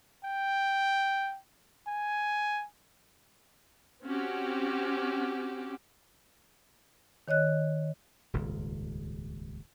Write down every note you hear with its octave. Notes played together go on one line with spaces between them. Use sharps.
G5
G#5
C4 C#4 F#4 G4
D#3 C#5 D#5 F#6
D#1 G#1 C#2